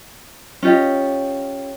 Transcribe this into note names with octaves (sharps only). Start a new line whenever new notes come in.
C#4 F4 G4 D#5